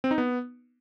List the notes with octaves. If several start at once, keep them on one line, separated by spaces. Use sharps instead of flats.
C4
D#4
B3